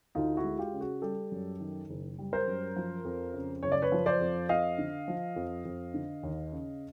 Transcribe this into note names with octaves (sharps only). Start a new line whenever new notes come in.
D2 D#4 F4
E4 F#4
G#3
F4 G4
C#3
F#4 G#4
G3 G4 A4
F#2
D#3
F#1
G3
A#4 C5
F#2
F3
F2
C#3
F#1 C#5
D5
B4 C#5
F3
C5 D5
F2
F2 D#5 F5
D3
F3
F2
F2
D3
D#2
C#3